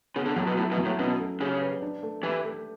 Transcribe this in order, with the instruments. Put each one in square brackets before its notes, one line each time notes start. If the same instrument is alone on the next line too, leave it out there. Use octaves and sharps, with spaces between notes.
[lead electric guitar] C#3 [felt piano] B3
[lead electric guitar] D3
[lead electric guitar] A2 [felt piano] F#3
[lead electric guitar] B2
[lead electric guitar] A2 [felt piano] E4
[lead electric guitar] B2
[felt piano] F#3
[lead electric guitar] A2
[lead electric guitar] B2 [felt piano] C#4
[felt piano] A3
[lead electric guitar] C#3 [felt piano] G4
[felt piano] B4
D4
A3
[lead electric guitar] E3 [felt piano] G4
[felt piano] A3